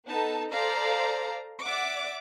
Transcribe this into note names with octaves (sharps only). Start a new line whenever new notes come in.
B3 D#4 A4 A5
A4 C5 D5 F5 A#5
D5 E5 F#5 D6